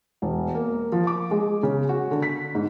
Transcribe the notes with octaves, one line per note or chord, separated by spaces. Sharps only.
E1
A#3
F3
D6
G#3
C#3
F#4
D3
B6
G#2